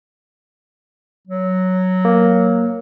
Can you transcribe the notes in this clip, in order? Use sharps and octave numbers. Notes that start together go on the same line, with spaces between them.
F#3
A#3